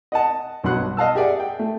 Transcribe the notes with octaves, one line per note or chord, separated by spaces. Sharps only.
D#5 F#5 A5
B1 G2 F#4 F#5 C6 F#6
D#5 F5 A5 E6
G4 G#4 D5 E5 F#5
G5
A3